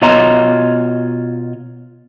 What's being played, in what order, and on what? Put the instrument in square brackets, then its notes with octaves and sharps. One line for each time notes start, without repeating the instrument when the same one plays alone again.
[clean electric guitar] B2 F4 C#5 D#5 A#5 C6